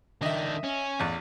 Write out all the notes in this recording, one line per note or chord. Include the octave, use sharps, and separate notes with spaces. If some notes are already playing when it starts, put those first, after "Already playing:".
D#3 D4 D#5 E5
C#4
A1 E2